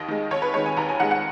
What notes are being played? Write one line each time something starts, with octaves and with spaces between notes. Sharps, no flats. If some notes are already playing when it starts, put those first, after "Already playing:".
Already playing: D#2 D#5
D#3 G#3
D#2 C#5
B4
D#3 G#3 C#5
G#5
D#2 A#5
G#5
D#3 G#3 F#5
F#5